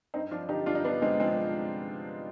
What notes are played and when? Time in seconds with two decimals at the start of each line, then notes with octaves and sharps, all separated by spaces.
0.14 G2 C4 D#4
0.31 F3 D4 F4
0.49 D3 D#4 G4
0.66 G2 D4 F4
0.75 D#4
0.84 D3 B3 D4
1.02 D3 G#3 C4
1.20 F3 G#3 C4
1.37 F3